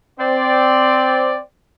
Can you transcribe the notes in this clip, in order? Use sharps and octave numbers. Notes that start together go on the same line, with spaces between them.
C4 D5